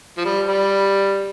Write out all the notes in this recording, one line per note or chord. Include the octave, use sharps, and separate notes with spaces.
F3
G3
G3